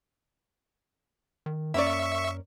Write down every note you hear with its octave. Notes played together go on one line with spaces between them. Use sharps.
D#3
F#2 A#3 C#4 D5 E5 C#6